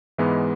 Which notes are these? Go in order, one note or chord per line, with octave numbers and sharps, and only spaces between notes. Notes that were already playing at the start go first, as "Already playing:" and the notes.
G#2 E3 G#3 B3 E4